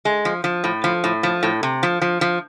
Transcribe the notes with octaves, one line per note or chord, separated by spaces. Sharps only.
G#3
F3
F3
A2
F3
A2
F3
A2
C3
F3
F3
F3